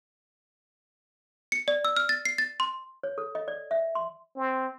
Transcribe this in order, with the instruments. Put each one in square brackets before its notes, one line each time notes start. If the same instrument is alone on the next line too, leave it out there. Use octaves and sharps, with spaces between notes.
[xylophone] C#7
D5
E6
F6
A6
C7
A6
C6
[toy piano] C#5
A4
D#5
D5
E5
C6
[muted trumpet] C4